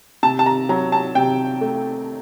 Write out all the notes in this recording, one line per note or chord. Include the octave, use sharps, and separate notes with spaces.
C3 A5
A5
A#5
F#3 A#5
A5
C3 G5
A3